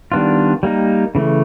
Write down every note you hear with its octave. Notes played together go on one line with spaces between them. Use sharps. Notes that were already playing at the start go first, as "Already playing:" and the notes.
D#3 G3 B3 D4 F4
G3 A#3 D#4
C#3 E3 A3